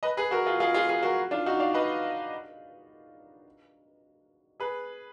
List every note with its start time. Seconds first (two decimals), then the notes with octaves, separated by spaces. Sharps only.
0.03 B4 D#5
0.17 G#4 B4
0.31 F#4 A#4
0.46 F4 G#4
0.60 F4 G#4
0.74 F4 G#4
0.89 F4 G#4
1.03 F#4 A#4
1.31 D4 F4
1.46 D#4 F#4
1.60 D5 F5
1.74 B4 D#5
4.60 G#4 B4